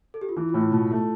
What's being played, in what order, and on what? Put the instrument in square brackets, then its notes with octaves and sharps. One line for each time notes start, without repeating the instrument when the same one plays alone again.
[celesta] A4
G4
F4
[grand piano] E3 [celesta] E4
[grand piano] A2 [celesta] F4
[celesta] E4
[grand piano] B2 [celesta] F4
[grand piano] A3